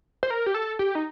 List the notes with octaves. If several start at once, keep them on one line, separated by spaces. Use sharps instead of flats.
C5
A#4
G4
A4
G4
D#4